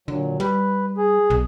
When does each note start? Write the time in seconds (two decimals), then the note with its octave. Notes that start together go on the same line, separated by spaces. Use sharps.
0.08 A#2 D3 F#3
0.40 G3 B4
0.97 G#4
1.30 B1